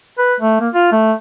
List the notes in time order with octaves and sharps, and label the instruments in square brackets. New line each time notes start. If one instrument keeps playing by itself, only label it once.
[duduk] B4
A3
A#3
F4
A3